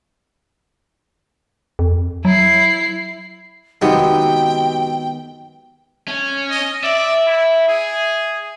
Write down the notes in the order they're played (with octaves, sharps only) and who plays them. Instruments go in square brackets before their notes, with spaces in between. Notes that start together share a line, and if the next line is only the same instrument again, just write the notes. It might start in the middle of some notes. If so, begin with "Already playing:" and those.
[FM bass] F2
[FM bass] F#3 [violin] E4 C7
[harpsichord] F#2 C3 B4 [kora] D#3 G#3 B3 [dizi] G5
[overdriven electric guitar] C#4
[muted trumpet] D#5
[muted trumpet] D5 [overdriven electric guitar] E5
[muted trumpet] E4
G#4